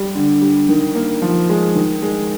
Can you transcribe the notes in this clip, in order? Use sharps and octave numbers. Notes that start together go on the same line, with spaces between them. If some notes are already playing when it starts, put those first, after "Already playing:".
Already playing: G3
D3
G3
D#3
A#3
F3
G#3
D#3
G#3